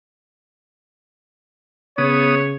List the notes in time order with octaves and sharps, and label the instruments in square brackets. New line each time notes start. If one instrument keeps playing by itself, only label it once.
[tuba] C#3 [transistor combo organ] B3 D#6 [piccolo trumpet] C#5